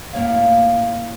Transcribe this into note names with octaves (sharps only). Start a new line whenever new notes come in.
A2 A#3 C#5 F5